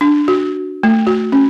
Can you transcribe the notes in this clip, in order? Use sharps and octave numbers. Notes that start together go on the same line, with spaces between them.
D4
F#4
A3
F#4
C#4